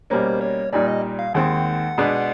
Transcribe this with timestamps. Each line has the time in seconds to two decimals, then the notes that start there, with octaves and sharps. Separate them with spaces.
0.10 B2 G3 A#3 C#4 C5
0.41 C#5
0.73 A#2 G3 A#3 D#4 D5
0.88 D#5
1.19 F5
1.34 D#2 D#3 G#3 C4 F#5
1.98 B2 G#3 B3 D4